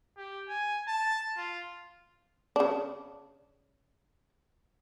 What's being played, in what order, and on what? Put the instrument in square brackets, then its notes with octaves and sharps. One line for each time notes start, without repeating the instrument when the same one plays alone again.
[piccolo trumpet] G4
G#5
A5
F4
[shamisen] C#3 D4